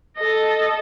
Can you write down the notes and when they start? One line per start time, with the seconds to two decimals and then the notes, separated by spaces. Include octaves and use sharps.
0.17 A4 D#5